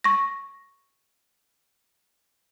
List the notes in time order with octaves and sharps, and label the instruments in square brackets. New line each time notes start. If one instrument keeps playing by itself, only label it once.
[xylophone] C#6 A#6